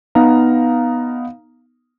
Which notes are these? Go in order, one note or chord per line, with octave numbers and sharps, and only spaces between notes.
B3 D#4 F5 A#5